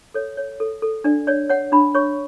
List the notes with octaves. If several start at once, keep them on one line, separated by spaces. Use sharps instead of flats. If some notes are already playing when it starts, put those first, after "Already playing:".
A4 C#5
C#5
A4
A4
D4 D5
C#5 D5
C#5 F#5
D4 B5
C#5 C#6